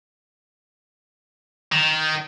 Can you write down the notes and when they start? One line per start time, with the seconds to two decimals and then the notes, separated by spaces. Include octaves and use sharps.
1.73 D#3